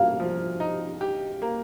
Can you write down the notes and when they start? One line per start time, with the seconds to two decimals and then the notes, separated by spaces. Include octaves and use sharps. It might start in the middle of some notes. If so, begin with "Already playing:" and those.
Already playing: A#3 F5
0.20 F3
0.60 D#4
1.01 G4
1.42 A#3